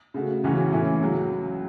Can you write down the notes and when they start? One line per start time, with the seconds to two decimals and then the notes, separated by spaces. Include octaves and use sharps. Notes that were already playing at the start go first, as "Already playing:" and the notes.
0.14 C#3 A3 F#4
0.44 C#2 C#3 E3 C#4 F#4
0.72 A2 E3 C#4 E4
1.00 C#2 C#3 F#3